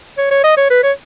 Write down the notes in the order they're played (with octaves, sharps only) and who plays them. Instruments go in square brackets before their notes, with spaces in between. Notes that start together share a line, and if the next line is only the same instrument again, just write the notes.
[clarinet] C#5
C#5
D#5
C#5
B4
C#5